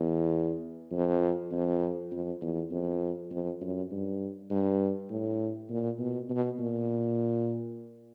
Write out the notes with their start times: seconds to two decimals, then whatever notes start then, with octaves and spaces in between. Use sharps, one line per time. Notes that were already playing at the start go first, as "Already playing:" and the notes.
Already playing: E2
0.92 F2
1.51 F2
2.12 F2
2.41 E2
2.71 F2
3.31 F2
3.61 F#2
3.91 G2
4.50 G2
5.10 A2
5.70 A#2
5.99 B2
6.29 B2
6.59 A#2